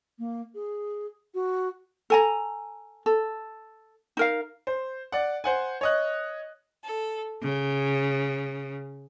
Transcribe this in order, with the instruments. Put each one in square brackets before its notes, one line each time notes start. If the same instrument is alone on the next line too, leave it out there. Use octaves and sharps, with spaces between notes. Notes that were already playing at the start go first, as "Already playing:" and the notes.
[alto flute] A#3
G#4
F#4
[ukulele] A4 G#5 A#5
A4
D#4 A#4 F5
[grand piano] C5
D5 F#5
C5 F#5 G#5
C#5 D#5 F#6
[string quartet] A4
C#3